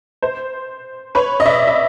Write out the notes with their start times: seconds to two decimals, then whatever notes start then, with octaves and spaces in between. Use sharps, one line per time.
0.22 C5
1.15 B4 C#5
1.40 D#5
1.46 D5 E5
1.67 E5